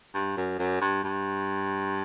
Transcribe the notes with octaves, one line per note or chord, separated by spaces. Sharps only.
G2
F#2
F#2
G2
G2